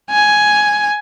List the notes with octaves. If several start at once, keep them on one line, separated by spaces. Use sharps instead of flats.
G#5